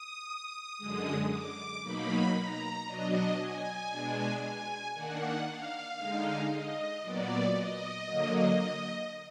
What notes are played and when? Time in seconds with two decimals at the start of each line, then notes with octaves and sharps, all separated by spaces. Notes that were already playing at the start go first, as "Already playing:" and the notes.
Already playing: D#6
0.78 F#2 D3 G#3
1.30 D6
1.82 B2 F#3 A#3 D#4 B5
2.34 A#5
2.85 B2 F#3 D4 D#5
3.38 G#5
3.90 B2 G#3 D4
4.41 G#5
4.94 D#3 A#3 D4 F#5
5.45 F5
5.97 D3 G#3 D#4
6.49 D#5
7.01 A#2 F#3 B3 D5
7.53 D#5
8.05 D3 F#3 A#3